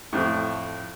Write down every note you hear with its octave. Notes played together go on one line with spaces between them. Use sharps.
F2 A2